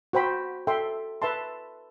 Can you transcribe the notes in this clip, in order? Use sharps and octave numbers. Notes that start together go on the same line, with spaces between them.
F#4 C5 G5 B5
A4 E5 G5 C6
B4 E5 A5 C6